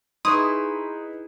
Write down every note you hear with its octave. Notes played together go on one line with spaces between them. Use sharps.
D#4 E4 G#4 B4 C6 C#6 D#6